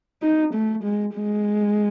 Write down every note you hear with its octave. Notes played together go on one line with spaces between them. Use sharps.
D#4
A3
G#3
G#3